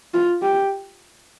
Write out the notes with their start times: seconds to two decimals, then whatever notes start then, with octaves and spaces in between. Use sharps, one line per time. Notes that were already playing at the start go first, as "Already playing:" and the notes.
0.14 F4
0.42 G4